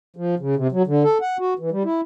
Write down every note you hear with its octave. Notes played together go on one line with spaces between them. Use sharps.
F3
C#3
C3
F#3
D3
A4
F#5
F#4
E3
G3
E4